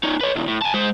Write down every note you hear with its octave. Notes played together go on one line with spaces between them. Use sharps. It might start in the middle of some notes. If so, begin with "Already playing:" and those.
C#4 D#4
B4 C#5
B1 E2
A2
G#5 A5
G#3 C5